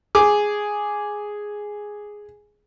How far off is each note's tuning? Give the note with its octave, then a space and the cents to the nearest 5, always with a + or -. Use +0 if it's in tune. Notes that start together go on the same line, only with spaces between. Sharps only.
G#4 +0 D6 +0